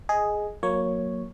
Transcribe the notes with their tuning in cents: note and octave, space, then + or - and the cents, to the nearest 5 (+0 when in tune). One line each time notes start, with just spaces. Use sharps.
G#4 +5 D#5 +0
F#3 -30 A#3 +0 C#5 +0